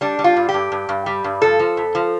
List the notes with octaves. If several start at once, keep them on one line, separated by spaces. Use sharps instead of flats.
G3 D4
G3
F4
G2
G4
G2
G2
G2
G3
G2
F3 A4
F3
F2
F3